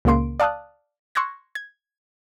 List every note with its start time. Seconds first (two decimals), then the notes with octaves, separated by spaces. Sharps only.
0.05 C#2 A#2 C#3 A#3 C6 D7
0.40 D5 F5 A5 D#6 F#6
1.15 C6 C#6 E6 F#6 G#6 A#6
1.55 G#6